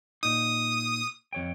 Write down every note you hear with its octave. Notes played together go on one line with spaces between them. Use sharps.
A#2 D#4 D#6
F2 C#5 G5